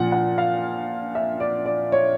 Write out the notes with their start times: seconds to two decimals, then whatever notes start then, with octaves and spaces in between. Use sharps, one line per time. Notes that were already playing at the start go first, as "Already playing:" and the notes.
Already playing: A#2 F3 F#5
0.12 F#5
0.38 F5
1.15 E5
1.40 D5
1.66 D5
1.92 C#5